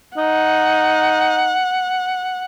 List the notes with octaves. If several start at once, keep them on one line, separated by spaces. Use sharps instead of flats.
D#4 F#5